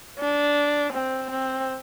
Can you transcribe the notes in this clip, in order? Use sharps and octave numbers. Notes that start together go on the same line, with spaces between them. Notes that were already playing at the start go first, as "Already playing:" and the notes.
D4
C4
C4